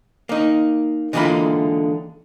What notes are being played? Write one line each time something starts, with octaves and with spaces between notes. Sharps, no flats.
A#3 D#4
D3 E3 G#3 A#3 F4 B5